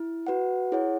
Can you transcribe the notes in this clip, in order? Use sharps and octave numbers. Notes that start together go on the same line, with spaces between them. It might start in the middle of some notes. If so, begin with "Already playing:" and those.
Already playing: E4
F#4 B4 F#5
E4 G#4 C#5 F#5